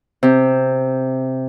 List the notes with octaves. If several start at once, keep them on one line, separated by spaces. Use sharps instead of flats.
C3